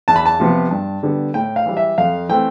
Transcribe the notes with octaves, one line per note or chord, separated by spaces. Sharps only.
E2 A5
B5
A5
C3 F3 B3
G2
D3 G3 B3
A2 G5
F5
E3 G3
E5
F2 F5
E3 A3 C4 G5